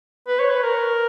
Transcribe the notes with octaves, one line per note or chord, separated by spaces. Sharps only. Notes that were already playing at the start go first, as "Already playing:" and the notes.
B4
C#5
B4
A#4